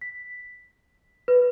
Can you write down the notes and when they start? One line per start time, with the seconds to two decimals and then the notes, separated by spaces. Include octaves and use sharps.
0.01 B6
1.28 B4